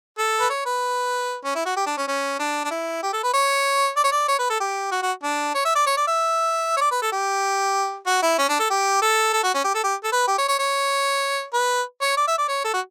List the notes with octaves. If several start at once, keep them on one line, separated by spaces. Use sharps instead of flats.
A4
B4
C#5
B4
C#4
E4
F#4
G4
D4
C#4
C#4
D4
D4
E4
G4
A4
B4
C#5
D5
C#5
D5
C#5
B4
A4
G4
F#4
F#4
D4
C#5
E5
D5
C#5
D5
E5
C#5
D5
B4
A4
G4
F#4
E4
C#4
D4
A4
G4
A4
A4
F#4
C#4
G4
A4
G4
A4
B4
G4
C#5
C#5
C#5
B4
C#5
D5
E5
D5
C#5
A4
F#4